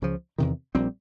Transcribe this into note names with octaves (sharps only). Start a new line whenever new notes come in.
C#2 C#3 F3
E2 C3 D#3
A#1 A#2 G3 C4